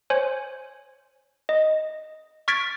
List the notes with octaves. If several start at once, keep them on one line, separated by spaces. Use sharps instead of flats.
C5 C#5 G#5
D#5
C#6 F6 G#6 A6 B6 D7